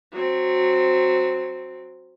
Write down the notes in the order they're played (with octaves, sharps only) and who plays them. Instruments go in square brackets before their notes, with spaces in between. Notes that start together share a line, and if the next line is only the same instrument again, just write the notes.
[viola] F#3 C4